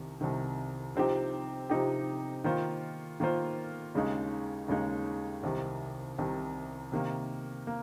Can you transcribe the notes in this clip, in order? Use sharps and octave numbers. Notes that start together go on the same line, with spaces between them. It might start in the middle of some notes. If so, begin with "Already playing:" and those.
Already playing: C2 C3 D#3
C2 C3 D#3
C3 F3 C4 D#4 G4
C3 F3 C4 D#4 G4
D#3 A#3 F4 C5
D#3 A#3 F4 C5
D#2 C#3 G#3 D#4
D#2 C#3 G#3 D#4
C2 C3 D#3
C2 C3 D#3
C3 D#3 A#3
A#3